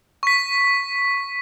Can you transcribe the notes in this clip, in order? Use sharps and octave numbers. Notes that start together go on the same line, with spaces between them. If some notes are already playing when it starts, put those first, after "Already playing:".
C#6 B6